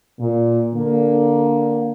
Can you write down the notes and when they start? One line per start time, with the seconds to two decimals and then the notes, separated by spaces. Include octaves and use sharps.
0.19 A#2
0.75 D3 A#3